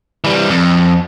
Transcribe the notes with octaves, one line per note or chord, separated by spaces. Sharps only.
E3 G3
F2